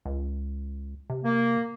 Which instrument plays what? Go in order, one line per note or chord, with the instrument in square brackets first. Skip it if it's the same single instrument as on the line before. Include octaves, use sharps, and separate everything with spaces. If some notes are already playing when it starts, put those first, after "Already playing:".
[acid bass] C#2
C3
[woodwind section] A#3